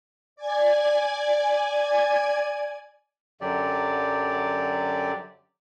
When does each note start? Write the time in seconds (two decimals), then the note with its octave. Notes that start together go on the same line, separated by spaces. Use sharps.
0.36 D5 G#5 G#6
3.41 F#2 D3 F#3 G4 D5